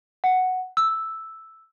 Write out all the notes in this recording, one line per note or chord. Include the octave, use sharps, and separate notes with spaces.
F#5
E6